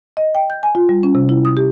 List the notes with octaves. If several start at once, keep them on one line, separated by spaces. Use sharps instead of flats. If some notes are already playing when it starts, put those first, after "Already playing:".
D#5
G5
G6
G#5
F4
G3
C#4
C3
E4
D#6
G4